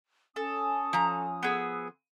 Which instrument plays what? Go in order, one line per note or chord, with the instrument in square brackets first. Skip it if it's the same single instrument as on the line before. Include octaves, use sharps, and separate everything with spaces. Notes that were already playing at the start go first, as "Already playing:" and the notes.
[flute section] C#4 G#5 D#6 [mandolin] A4
[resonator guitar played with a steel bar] F3 A#5
[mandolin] B3 G#4 E6